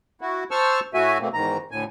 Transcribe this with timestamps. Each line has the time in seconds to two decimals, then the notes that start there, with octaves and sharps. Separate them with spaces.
0.21 E4 F#4
0.51 C5 A5 C#6 E6 F6
0.94 A2 A3 F#4 E5 G#5
1.21 B2 A3 A#3 C4
1.33 E2 G#2 D#3 A#5
1.71 D2 A2 G#5